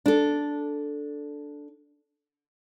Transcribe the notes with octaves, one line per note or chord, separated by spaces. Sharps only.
D4 A4